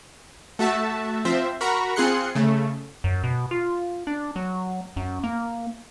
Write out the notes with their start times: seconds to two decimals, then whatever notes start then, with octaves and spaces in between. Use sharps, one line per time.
0.59 A3 F#4 E5 A5
1.25 F3 C4 C5 E5
1.61 F#4 A#4 A#5 B5 C#6
1.96 C4 F4 G#4 C6 F#6 C#7
2.35 C#3 A3
3.04 F#2
3.24 B2
3.51 F4
4.07 D4
4.36 F#3
4.96 F#2
5.24 A#3